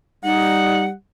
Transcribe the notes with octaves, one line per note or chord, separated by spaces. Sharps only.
G3 D#4 F#5